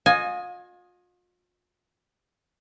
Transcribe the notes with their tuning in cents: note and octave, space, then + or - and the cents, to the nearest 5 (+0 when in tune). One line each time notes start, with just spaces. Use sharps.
F4 +40 D#5 -5 G#5 +5